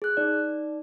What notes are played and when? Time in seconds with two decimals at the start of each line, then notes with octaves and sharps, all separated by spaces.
0.02 G#4 F#6
0.17 D#4 D5